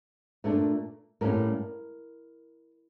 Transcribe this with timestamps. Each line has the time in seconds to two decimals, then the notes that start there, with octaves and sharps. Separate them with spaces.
0.44 A#2 A3 D4
1.21 A2 G3 A#3 C#4 A#4